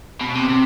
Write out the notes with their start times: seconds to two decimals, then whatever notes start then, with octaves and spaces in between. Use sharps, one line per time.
0.21 B2
0.35 C3
0.49 C3